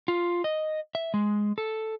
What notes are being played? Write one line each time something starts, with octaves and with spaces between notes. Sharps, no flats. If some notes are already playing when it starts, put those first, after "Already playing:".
F4
D#5
E5
G#3
A4